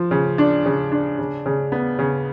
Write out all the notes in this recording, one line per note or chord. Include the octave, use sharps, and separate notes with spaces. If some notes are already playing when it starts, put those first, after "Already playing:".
Already playing: F3
C#3
D4
C#3
D4
C#3
C#3
B3
C#3